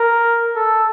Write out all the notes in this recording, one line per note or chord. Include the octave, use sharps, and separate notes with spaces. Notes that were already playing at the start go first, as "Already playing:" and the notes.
Already playing: A#4
A4